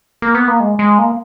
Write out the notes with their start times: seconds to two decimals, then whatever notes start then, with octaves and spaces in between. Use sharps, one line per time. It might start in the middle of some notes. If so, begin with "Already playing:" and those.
0.22 A#3
0.35 B3
0.48 A#3
0.60 G#3
0.79 G#3
0.99 A#3